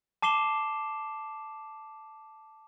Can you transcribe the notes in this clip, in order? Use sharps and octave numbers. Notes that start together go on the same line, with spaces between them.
A5 D6 C7 E7 G7